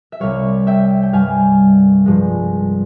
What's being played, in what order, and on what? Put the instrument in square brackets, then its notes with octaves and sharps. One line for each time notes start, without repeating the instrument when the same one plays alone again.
[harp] E5
C2 C3 G3 C#5 F5
E5 G5
G5
G2 G3 F5 G#5
G2 F3 G#3